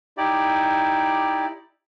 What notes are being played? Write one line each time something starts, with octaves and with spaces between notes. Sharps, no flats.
D#4 E4 G4 D5